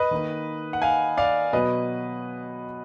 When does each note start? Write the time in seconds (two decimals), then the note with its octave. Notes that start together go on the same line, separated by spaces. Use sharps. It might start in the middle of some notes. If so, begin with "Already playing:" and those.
Already playing: B4 D#5
0.11 D#3 A#3 D#4
0.73 F#5
0.82 F5 G#5
1.17 D5 F5
1.53 B2 F#3 B3 B4 D#5